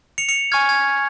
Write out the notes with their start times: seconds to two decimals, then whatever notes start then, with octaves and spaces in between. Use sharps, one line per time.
0.18 C#7 F7
0.29 C#7 F7
0.52 G#5 C#6 F6 G#6
0.69 G#6